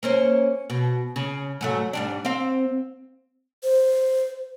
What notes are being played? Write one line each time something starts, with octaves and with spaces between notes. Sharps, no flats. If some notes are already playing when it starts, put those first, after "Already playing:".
A#3 C#4 C5
B2
C#3
G#2 F#3 A3
G#2 G3 D4
C4 F5
C5